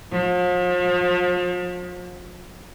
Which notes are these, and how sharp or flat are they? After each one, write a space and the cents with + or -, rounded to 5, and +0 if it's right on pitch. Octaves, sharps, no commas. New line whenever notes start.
F3 +40